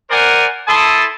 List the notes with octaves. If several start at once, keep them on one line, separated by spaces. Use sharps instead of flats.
A#4 C5 D5 F#5 G#5
E4 A4 A5 C6 D#6